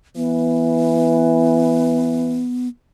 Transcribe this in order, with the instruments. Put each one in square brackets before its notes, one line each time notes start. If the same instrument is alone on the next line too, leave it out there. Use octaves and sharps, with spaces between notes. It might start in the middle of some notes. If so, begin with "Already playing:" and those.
[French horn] E3 [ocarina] B3